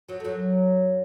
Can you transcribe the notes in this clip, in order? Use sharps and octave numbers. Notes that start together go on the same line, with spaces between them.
F#2 F#3
A3
F#2 F#3